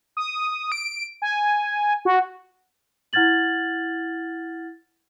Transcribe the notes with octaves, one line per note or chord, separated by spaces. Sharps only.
D#6
D7
G#5
F#4
E4 F#5 F6 G#6 A6 F#7